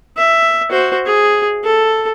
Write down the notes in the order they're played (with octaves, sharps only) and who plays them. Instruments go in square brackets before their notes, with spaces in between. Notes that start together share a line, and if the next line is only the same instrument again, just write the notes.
[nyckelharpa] E5
F#4 C5
G#4
A4